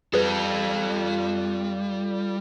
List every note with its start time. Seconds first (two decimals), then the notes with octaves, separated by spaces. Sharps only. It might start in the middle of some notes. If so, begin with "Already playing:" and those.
0.14 G3 F4 G#4 A4 B4